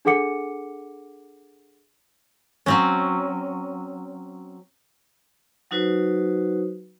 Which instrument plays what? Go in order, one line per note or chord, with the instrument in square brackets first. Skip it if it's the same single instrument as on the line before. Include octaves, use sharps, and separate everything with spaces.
[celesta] D4 G#4 A4 F#5 D6 C#7
[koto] F#3 C4 C#4
[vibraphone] F#3 D#4 F#4 B4 C5